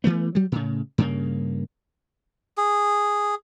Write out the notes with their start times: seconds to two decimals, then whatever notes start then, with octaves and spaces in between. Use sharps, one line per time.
0.04 E3 F3 A3 B3
0.35 F#3 G3
0.52 A2 C#3
0.98 G2 C#3 A#3
2.57 G#4